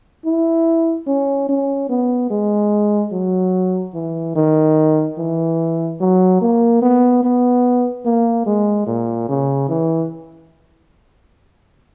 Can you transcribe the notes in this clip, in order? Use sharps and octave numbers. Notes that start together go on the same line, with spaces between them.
E4
C#4
C#4
B3
G#3
F#3
E3
D#3
E3
F#3
A#3
B3
B3
A#3
G#3
A#2
C#3
E3